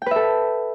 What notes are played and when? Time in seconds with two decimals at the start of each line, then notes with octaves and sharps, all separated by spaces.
0.02 G5
0.06 B4
0.11 E5
0.16 A4